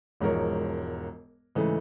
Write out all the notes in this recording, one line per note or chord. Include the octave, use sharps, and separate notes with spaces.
E1 G#2 F3 A#4 C#5
G#2 C#3 E3 A3